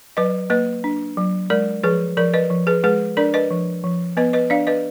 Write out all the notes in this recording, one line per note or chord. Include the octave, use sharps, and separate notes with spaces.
F#3 B4 D#5
A#3 B4 D#5
D4
F#3
G#3 A#4 D5
F3 G#4 B4
F3 A#4 D5
B4 D#5
F3
G#4 B4
G#3 G#4 B4
D4 A#4 D5
B4 D#5
F3
F3
B3 B4 D#5
B4 D#5
D4 D5 F5
B4 D#5